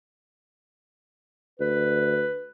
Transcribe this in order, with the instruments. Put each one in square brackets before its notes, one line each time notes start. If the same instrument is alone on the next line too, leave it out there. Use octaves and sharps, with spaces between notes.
[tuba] D2 [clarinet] B4